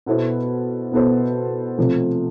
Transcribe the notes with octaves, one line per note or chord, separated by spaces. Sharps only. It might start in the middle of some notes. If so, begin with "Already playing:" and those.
B2 B3 E4 A4 C5
B2 B3 E4 A4 C5
C3 F3 A3